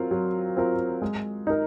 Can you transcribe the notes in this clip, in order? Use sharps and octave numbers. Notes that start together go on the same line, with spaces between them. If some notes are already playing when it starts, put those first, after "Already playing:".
Already playing: F#3 C4 F4 A#4
F#3
C4 F4 A#4
G#3
D#4 A#4